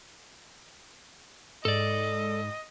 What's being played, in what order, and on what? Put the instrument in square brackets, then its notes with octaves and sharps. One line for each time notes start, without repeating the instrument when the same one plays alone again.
[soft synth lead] G#2 [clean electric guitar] A4 D5 [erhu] D#5